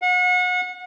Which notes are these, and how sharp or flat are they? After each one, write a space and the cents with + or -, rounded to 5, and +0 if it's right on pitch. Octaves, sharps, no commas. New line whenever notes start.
F#5 -35